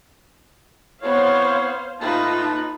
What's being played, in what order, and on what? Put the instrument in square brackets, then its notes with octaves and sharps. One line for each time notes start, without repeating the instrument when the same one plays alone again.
[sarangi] B3 [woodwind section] C4 E4 C#5 [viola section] C5 F5
[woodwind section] A2 A#3 A5 [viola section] D#4 F4 [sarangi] B4